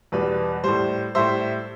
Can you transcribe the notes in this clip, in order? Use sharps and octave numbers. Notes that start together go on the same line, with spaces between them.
E2 B2 G3 B4
A2 G3 C5
A2 G3 C5 E5